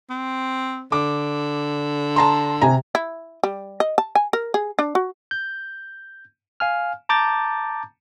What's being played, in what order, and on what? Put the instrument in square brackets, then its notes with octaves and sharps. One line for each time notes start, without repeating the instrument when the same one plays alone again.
[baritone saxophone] C4
[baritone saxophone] D3 [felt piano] D6
[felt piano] A5 A#5 C6
C3 G#5 A#5
[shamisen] E4
G3
D#5
A5
G#5
A#4
G#4
D4
F#4
[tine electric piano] G6
F5 G#5 F6
A5 A#5 D6 G6 A6